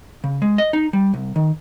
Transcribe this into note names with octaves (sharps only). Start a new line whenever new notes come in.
C#3
G#3
D#5
D#4
G3
C2
D#3